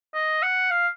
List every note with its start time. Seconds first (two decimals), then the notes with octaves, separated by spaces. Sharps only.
0.14 D#5
0.43 F#5
0.71 F5